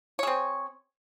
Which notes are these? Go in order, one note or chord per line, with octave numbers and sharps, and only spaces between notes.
C4 G#4 C#5